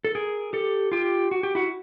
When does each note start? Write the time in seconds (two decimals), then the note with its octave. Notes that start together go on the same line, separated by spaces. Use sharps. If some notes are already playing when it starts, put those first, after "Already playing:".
0.05 A4
0.15 G#4 A#4
0.53 G4 A4
0.92 F4 G4
1.31 F#4
1.43 G4
1.55 E4 F#4